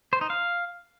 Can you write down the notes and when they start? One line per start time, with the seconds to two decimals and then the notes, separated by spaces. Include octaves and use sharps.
0.13 C5
0.21 D#4
0.30 F5